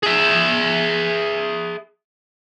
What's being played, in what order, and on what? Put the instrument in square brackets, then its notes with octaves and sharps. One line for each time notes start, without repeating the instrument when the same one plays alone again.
[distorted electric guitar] G#4 E5